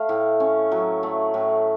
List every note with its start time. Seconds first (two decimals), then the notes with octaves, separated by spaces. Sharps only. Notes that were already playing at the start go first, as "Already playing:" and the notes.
Already playing: A3 F5
0.09 A2
0.40 C#4
0.72 F#3
1.03 A3
1.34 A2